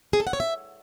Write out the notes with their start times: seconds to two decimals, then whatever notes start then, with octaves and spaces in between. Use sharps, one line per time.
0.13 G#4
0.20 A4
0.27 F#5
0.33 C#5
0.40 E5